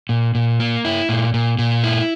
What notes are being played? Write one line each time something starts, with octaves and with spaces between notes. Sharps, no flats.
A#2
A#2
A#3
E4
A#2
A#2
A#2
E4